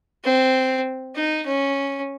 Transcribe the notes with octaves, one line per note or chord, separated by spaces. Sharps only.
C4
D#4
C#4